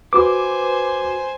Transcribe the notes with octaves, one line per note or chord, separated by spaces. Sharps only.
F#4 B4 C5 G#5 D6